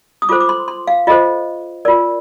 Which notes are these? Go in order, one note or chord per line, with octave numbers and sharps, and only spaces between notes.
D#6
F4 A4 C5 D6
D6
C6
C6
F5
F4 A4 C5 D#5
F4 A#4 D5